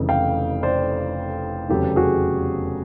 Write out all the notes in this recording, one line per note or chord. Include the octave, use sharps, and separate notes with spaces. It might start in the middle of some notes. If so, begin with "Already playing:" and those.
Already playing: F1 F2 C#3 E3
F5 G5
C5 D5
F1 E2 C#3 F#3 B3 G4 A4
F#4 G#4